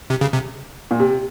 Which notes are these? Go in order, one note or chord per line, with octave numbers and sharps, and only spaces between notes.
C3
C#3
C3
A#2
C3